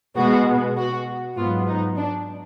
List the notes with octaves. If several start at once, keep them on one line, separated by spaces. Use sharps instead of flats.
B2 G#3 B3 F#4
F#4
G#2 F#3 B3 F4
D#4
D4